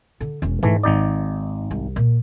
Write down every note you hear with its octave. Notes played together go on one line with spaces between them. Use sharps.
D3
E1 C#4
G#2 E3 A3
G#1 D#4 D5
C2
A#2